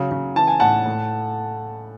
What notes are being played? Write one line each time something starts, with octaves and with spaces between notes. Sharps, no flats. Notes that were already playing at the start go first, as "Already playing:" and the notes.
Already playing: C#3 F#3
C#3
E3 A5
G#5
A2 F#5 A5
A2